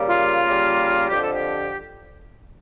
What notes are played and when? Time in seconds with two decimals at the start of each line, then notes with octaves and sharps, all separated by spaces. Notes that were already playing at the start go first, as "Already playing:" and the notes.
Already playing: C#3 G3 A#3
0.09 F4
0.46 C#3 G3 A#3
1.10 F2 D3 F3 G4
1.22 A4
1.33 G4